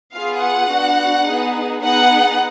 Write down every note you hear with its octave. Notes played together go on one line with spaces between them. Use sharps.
B3 F4 G#4 F5
F#5
B3 D4 F#4
B3 D#4 G#4
B3 D#4 G#4 F#5